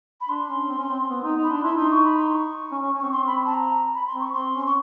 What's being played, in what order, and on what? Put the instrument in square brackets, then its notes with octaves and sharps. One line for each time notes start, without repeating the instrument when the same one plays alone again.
[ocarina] B5
[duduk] D4 [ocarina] C6
[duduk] C#4
C4
C#4
C4
B3
D#4
D#4
[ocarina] B5
[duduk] D4 [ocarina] C6
[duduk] E4 [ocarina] C6
[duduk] D#4 [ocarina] C6
[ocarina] C#6
B5
C6
C#6
[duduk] C#4
C#4
C#4
[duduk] C4 [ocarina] C#6
[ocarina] C6
B5
A5
A#5
B5
C6
[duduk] C4
[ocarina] C#6
[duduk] C4 [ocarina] C6
[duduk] C#4
[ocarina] C#6